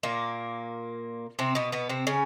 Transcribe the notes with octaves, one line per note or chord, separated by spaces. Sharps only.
A#2 A#3
C3 C4
B2 B3
B2 B3
C3 C4
C#3 C#4